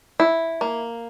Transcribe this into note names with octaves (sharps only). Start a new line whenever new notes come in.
E4
A#3